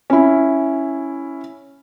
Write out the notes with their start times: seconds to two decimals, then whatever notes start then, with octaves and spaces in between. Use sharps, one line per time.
0.10 C#4 E4